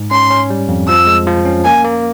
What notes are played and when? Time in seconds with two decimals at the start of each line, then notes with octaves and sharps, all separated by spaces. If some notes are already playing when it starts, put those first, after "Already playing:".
Already playing: G#2
0.11 C#4 C6
0.30 C#4
0.50 G3
0.68 F2
0.88 F3 E6
1.07 G#3
1.27 F3
1.45 C#4
1.64 A#3 G#5
1.84 A#3